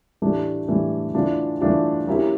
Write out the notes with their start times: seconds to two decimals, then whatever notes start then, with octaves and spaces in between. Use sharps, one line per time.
0.22 A2 E3 A3 D4 G4
0.68 A2 E3 A3 D4 G4
1.15 E3 A3 D4 F4
1.60 E3 A3 D4 F4
2.07 F#3 A#3 C#4 E4 G4